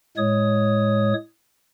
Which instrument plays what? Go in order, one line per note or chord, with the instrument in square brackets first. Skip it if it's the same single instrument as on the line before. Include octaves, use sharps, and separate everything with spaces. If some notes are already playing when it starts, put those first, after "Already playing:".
[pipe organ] A2 G#3 C#5 D#6